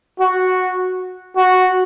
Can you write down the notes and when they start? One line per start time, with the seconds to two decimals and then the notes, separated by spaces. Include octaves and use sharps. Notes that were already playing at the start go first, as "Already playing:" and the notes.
0.19 F#4
1.37 F#4